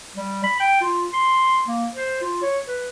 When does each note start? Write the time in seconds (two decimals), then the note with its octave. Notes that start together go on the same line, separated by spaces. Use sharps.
0.15 G3
0.44 B5
0.60 G5
0.81 F4
1.13 C6
1.68 A#3
1.95 C5
2.21 F4
2.42 C#5
2.68 B4